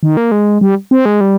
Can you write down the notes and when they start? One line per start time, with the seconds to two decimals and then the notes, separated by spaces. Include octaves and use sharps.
0.03 D#3
0.17 A#3
0.32 G#3
0.61 G3
0.91 C4
1.05 G#3
1.21 G3